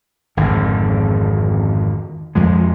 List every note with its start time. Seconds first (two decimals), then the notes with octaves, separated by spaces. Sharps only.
0.37 G#1 F2 D3
2.35 F2 F3 G#3